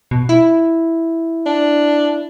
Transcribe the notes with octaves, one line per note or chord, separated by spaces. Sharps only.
B2
E4
D4